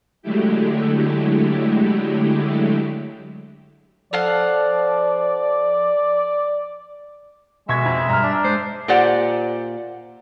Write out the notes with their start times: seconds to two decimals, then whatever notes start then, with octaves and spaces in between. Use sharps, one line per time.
0.22 D3 F#3 G#3 A3 E4 G4
4.13 F3 A4 D5 F5 F#5
7.69 B2 G#3 E5 C#6 G#6
7.85 F2
8.09 G2 A#5 F6
8.23 D4
8.44 G#3 C5
8.88 A#2 G4 C5 D5 F#5